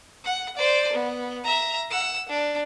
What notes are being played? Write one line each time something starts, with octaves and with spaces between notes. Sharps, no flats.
F#5
C5 D5
B3
E5 A#5
F#5 E6
D4